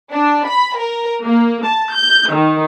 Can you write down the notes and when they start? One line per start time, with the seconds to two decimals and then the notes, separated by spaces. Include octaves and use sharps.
0.11 D4
0.48 B5
0.79 A#4
1.24 A#3
1.66 A5
1.95 G6
2.32 D#3